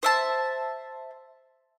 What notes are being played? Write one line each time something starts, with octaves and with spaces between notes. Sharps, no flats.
C5 E5 A5